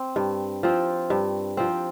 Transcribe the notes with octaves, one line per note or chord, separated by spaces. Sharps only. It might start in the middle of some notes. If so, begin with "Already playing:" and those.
Already playing: C4
G2
F3 C4
G2
F3 C4